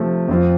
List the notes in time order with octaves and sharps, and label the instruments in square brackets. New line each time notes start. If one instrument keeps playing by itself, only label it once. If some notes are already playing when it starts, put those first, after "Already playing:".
Already playing: [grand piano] C3 F3 A3
F2 F3 C4 F4